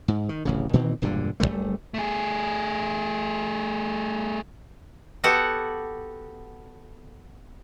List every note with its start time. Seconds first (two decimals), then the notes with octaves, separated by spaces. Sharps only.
0.08 G#2
0.29 D#3
0.45 D1 A1 C#3
0.73 A#2 D#3 E3 C4
1.02 E1 G2 A#2 D3
1.40 F#1 F#2 G3 A3
1.94 A3 G#4
5.24 B3 F#4 G4 A4 F#5